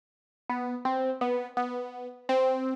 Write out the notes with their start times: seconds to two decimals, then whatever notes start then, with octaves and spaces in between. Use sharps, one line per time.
0.49 B3
0.85 C4
1.21 B3
1.57 B3
2.29 C4